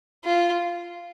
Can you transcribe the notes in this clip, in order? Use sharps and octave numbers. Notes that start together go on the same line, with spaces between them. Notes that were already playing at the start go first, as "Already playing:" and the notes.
F4